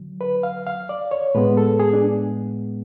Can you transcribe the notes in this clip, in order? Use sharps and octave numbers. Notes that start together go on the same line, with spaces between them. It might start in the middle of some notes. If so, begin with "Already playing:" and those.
Already playing: D3 F#3
B4
F5
F5
D5
C#5
A2 G#3 B3 B4
A4
G#4
D4